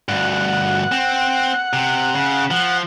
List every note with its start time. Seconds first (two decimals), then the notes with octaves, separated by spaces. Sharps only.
0.09 D2 G2 F#5
0.92 C4
1.73 C3
2.15 C#3
2.51 F3 F#5